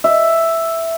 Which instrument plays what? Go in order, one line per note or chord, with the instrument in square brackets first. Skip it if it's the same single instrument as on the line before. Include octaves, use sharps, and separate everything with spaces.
[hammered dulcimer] E5